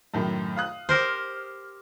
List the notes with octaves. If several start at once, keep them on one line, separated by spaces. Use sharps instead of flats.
F#2 A2 D#3
F5 D#6 F#6
G4 A#4 C5 F6